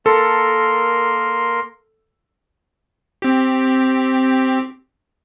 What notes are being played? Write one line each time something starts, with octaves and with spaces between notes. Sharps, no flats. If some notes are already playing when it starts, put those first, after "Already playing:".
A#3 A4 A#4 C6
C4 G4